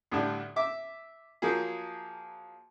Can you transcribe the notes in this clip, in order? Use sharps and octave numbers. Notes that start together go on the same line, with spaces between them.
D2 A2 D3 G3
E5 D6
F3 F#3 A#3 G#4